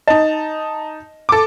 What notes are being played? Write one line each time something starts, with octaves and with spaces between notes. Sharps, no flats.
D#4 D#5 A5
A4 D6